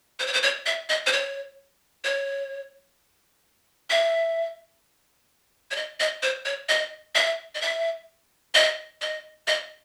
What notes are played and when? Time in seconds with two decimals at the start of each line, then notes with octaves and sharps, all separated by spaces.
0.19 C5
0.27 C#5
0.33 C5
0.43 C#5
0.66 E5
0.89 D#5
1.06 C5
1.13 C#5
2.04 C#5
3.90 E5
5.71 C#5
5.76 D#5
6.00 D#5
6.23 C5
6.45 C#5
6.69 D#5
7.15 E5
7.55 D#5
7.61 E5
8.55 D#5
9.01 D#5
9.47 D#5